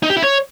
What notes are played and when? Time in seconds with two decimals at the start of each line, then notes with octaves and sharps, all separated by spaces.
0.03 D#4
0.10 G4
0.17 E4
0.24 C#5